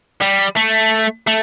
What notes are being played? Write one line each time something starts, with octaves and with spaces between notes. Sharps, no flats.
G3
A3
A3